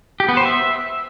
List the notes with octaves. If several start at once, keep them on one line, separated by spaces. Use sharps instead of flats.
G4
B3
C5
E5